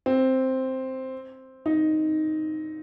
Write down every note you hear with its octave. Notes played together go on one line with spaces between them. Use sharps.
C4
D#4